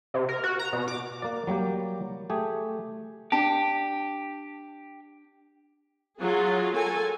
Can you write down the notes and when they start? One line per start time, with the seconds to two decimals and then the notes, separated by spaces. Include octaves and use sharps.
0.14 C3
0.29 A#4
0.44 F#4
0.59 A#5
0.73 B2
0.88 D6
1.22 A#3 D5
1.47 F#3 G3 A#3 G4
2.30 A3 G4 G#4
3.32 D4 G4 A5
6.20 F#3 F4 G#4
6.75 A4 A#4 G#5